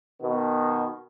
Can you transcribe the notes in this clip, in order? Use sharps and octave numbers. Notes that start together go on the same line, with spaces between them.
B2 D#3 B3